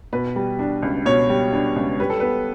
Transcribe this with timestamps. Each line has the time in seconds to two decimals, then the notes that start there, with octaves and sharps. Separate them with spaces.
0.13 B2 B4
0.36 G3
0.59 D4
0.83 C#2
1.06 B2 C#5
1.30 G3
1.52 D4
1.76 C#2
2.00 G3 B4
2.10 A4
2.20 B3 B4